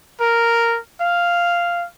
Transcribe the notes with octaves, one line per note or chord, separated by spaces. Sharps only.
A#4
F5